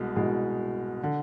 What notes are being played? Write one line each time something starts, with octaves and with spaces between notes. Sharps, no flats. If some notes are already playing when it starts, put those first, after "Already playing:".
Already playing: C2 B2 G#3
C2 B2 G#3
D3